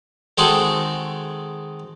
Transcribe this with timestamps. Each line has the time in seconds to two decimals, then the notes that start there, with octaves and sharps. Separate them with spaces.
0.38 D#3 G#3 C4 F#4 G#4 A4